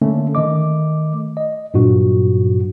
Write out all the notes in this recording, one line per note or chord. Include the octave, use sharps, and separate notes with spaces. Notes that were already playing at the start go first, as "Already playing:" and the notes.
D3 A3 A#3 C#4
D#3 A3 D#5 D6
D#5
G2 A#2 F#3 F#4